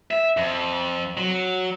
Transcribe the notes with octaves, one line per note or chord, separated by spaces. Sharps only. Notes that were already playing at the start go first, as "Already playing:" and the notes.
E5
F2
F#3